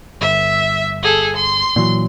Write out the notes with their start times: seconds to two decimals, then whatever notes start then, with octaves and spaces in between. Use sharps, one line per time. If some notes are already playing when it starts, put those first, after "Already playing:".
0.21 G1 E5
1.03 G#4 A4
1.36 C6
1.76 A#2 E3 F#3